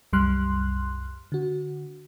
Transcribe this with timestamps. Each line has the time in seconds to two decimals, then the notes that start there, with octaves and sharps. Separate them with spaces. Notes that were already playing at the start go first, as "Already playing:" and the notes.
0.13 C2 F#2 G3 C6 F6 F#6
1.32 D3 F#4